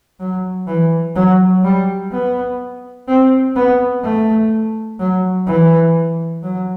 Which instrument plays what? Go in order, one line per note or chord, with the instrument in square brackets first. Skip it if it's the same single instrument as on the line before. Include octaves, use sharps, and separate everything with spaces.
[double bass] F#3
E3
F#3
G3
B3
C4
B3
A3
F#3
E3
F#3